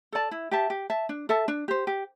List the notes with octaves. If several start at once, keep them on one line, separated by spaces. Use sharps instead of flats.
A4 D5 A5
E4
G4 E5 A5
G4
E5 A5
D4
A4 E5 A5
D4
G4 C5
G4